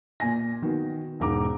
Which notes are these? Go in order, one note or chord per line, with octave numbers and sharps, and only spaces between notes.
A#2 G#5 A#6
D#3 B3 F#4
E1 G#2 A#5 D6